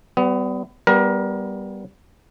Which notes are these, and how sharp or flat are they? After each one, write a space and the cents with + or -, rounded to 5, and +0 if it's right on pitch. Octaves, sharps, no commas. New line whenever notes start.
G3 -25 B3 +25
G3 +0 B3 +0 A#4 +25